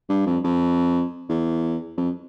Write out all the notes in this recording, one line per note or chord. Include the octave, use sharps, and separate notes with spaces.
G2
F2
F2
E2
F2